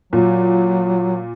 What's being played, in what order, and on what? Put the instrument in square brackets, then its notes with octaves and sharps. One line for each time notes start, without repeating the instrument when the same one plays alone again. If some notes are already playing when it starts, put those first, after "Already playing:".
[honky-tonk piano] A#2 [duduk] F#3